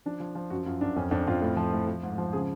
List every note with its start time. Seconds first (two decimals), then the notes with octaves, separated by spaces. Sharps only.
0.06 F3 D4
0.20 F3
0.35 F3
0.50 F#2 F#4
0.66 F#2 F4
0.81 F#2 D4
0.96 F2 C#4
1.11 F2 D4
1.27 F2 F4
1.41 A2
1.56 F3
1.73 A2
1.88 F3
2.03 G#2
2.18 F3
2.33 C#3 G#4